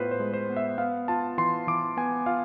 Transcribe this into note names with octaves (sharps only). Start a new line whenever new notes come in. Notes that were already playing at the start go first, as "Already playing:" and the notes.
Already playing: A2 B3 F4 B4 C5
C5
G#3
C5
B3
E5
B3 F5
F4 A5
E3 C6
E3 D6
B3 G#5
F4 F5